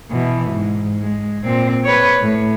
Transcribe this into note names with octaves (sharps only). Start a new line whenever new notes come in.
B2 E3
G#2
G#3
A#2 C4
B4 C#5
A2